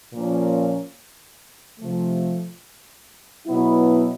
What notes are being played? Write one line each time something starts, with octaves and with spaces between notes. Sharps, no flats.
A#2 F3 A#3 C#4
C3 F3 A3
B2 F#3 B3 E4